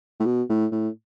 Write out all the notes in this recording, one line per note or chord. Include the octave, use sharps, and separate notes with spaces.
A2
B2
A2
A2